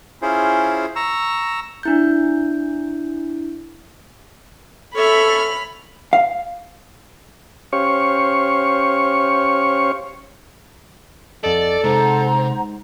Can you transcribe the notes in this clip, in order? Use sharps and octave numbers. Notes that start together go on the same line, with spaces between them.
C#4 E4 F4 G#4 C5
A#5 C#6 E6
D4 E4 G6
A4 C#5 E5 B5 F6
F5
C#4 G4 C5 C#5 F5 C#6
F2 A4 D5 D#5
C3 G#3 D#4 C5 F#5 A#5